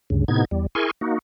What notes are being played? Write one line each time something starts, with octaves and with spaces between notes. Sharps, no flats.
D2 G2 C#3
A2 C3 B3 D#4 G#6
E2 G3
E4 G#4 A#4 G#5 C6 C#6
A#3 D#4 F#4